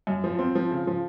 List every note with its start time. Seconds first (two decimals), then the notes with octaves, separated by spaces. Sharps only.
0.07 F#2
0.24 F3
0.39 C4
0.55 F3
0.71 C#3
0.87 F3